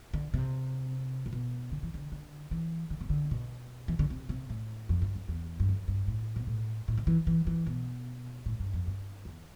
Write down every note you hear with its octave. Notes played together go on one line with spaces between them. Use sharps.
D3
C3
A2
B2
D3
E3
D3
D3
E3
D3
C3
D3
B2
E3
D3
C3
C3
A2
F2
G2
F2
E2
G2
F2
G2
A2
B2
A2
A2
D3
E3
E3
E3
B2
A2
G2
F2
G2
E2